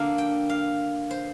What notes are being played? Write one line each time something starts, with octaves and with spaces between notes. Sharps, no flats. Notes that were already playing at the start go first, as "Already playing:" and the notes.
Already playing: D3 A#3 D4 F5
G5
F5
C5